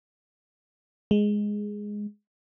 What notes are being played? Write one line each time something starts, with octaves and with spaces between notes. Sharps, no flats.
G#3